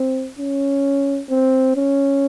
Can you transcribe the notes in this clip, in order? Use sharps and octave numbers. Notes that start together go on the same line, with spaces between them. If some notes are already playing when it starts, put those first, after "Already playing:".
Already playing: C4
C#4
C4
C#4